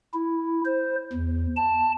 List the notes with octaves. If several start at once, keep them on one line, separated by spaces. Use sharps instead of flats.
E4
C5
E2
A5